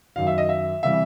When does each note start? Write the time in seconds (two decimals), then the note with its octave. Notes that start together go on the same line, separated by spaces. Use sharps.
0.16 F#2 D#3 F#3 F5
0.27 E5
0.38 D#5
0.49 E5
0.83 C3 E3 G3 E5